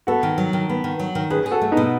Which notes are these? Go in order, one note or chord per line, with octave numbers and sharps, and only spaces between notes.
B3 F#4 A4
D#3
F#3
D#3
B3
D#3
F#3
D#3
C#4 G#4 B4
G#4
F#4 A4
A3
B3 D#4
B2